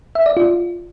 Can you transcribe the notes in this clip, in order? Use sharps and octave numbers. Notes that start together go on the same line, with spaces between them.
E5
D5
F4